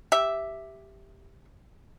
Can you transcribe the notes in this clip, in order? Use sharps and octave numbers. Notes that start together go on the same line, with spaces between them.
G4 E5